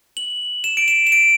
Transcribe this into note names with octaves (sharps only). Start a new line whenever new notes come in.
F#7
E7
D7
E7
E7
D7